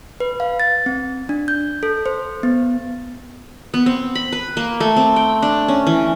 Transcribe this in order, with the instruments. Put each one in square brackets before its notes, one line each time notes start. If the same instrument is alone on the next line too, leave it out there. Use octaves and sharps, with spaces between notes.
[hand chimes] B4
F5
A6
C4
D4
G6
A4
C5
B3
[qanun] B3
C4
B5
B4
A#3
A3
C4
G5
D4
C#4
E3